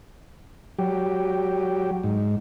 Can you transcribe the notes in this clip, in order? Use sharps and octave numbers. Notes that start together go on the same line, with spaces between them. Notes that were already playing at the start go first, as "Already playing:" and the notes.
F#3 G4
G#2